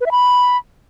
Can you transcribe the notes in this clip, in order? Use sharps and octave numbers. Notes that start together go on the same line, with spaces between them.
B4
E5
B5